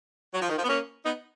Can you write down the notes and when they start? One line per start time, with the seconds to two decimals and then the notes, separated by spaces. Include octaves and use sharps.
0.33 F#3
0.41 F3
0.49 D#3
0.57 F3
0.64 B3
0.68 A#3 C#4
1.04 B3 D#4